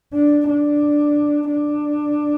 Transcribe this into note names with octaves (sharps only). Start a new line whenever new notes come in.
D4
D4
D4